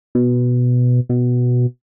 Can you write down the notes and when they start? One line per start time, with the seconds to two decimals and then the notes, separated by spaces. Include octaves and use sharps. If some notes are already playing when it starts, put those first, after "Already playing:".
0.15 B2
1.09 B2